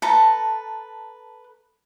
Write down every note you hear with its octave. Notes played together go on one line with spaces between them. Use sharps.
A4 B4 A5 A#5